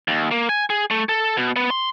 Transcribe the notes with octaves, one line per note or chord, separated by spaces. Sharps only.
D#2
A#3
G#5
G#4
A3
A4
B2
B3
C6